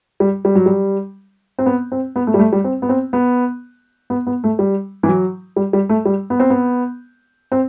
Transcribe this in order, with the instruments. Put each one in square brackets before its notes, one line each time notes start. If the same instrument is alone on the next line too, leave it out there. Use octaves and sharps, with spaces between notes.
[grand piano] G3
G3
F#3
G3
C4
B3
C4
B3
A3
G3
A3
G3
C4
B3
C4
B3
B3
B3
A3
G3
E3
F#3
G3
G3
A3
G3
B3
C4
B3
C4